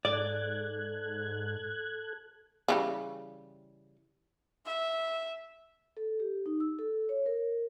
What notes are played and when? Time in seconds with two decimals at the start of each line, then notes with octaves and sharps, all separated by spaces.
0.05 G#2 A4 D5 F#6 G#6
2.68 C#3 E3 G3
4.65 E5
5.97 A4
6.20 G4
6.46 D#4
6.60 E6
6.79 A4
7.09 C#5
7.26 A#4